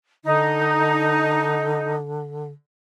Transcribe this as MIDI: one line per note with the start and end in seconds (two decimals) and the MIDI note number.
0.25 2.51 50
0.25 1.95 63